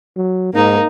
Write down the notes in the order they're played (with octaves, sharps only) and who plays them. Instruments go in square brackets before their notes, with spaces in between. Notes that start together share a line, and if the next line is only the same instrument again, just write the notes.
[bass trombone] F#3
[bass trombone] G#2 [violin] A#3 D#4